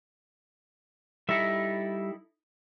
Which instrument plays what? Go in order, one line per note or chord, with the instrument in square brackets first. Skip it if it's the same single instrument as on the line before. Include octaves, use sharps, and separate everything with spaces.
[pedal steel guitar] G3 E5 [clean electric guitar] D#4 E4 A4